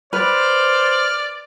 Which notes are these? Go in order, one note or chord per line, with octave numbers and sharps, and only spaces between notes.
B4 C5 D5 F6